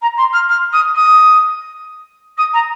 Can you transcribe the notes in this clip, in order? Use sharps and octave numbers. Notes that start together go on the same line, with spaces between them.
A#5
C6
F6
F6
D#6
D#6
D#6
A#5